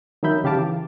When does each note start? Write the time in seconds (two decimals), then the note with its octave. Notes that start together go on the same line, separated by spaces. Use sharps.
0.23 D#3 F#3 D#4 E5 B5 G6
0.44 C#3 G4 F5 A5 D6
0.56 E3